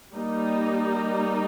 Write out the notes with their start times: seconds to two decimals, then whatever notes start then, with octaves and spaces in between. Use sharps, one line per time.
0.15 G3 A#3 D#4